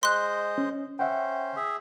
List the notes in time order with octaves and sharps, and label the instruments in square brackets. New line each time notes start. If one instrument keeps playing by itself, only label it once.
[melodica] G#3 C5 D#5 [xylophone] C6 F#6
[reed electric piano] C#4
[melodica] C#4 C5 [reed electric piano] E5 F#5 G5
[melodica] G#4 E5